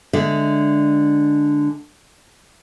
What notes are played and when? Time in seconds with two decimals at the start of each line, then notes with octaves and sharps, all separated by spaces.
0.13 D3 G#3 E5